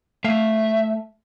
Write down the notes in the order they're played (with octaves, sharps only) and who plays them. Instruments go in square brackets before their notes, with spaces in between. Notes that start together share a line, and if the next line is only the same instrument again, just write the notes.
[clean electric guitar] A3 F5 [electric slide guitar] E5